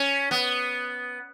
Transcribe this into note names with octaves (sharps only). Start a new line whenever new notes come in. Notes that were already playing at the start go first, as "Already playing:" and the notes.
Already playing: C#4
B3